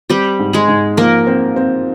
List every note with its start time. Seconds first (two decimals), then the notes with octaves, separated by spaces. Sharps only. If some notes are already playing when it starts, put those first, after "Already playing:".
0.10 G3 C4 G4
0.39 G#2
0.53 G#3 G#4
0.68 G#2
0.97 F3 A#3 A#4
1.27 C4
1.56 C4